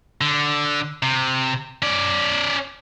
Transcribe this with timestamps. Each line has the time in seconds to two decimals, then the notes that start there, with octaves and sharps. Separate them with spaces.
0.21 D3
1.03 C3
1.82 C#4 D5